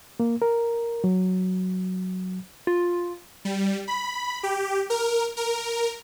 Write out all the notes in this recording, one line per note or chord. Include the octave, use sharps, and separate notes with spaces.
A#3
A#4
F#3
F4
G3
B5
G4
A#4
A#4